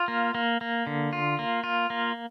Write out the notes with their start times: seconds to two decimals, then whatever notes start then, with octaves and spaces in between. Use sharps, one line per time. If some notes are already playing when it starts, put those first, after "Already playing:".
Already playing: F4
0.08 A#3
0.35 A#3
0.61 A#3
0.87 D3
1.13 F4
1.39 A#3
1.64 F4
1.90 A#3